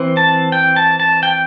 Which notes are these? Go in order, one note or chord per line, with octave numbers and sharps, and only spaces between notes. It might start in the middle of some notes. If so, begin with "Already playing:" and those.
Already playing: E3 C4
A5
G5
A5
A5
G5